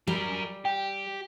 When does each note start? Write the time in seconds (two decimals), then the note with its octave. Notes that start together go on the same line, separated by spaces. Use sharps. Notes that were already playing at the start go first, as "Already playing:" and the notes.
0.07 F#3 G3 A#4
0.65 G4 G5